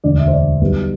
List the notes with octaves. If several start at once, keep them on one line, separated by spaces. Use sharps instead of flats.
E1 D2 D3 D5
E5
C5
D5
B1 B2 G3